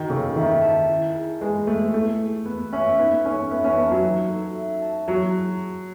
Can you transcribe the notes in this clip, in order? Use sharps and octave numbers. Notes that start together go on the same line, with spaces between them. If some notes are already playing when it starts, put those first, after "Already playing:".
Already playing: D#3 F#4
C#3 A4
D#3 E5
A5
E4
G#4
G#3 B4
A3 E5
A3 E4
G#4
B3 B4
C#4 E5
B3 D#4
C#4 A4
B3 E5
C#4
B3 A5
F#3
D#4
A4
E5
A5
F#3 E4
G#4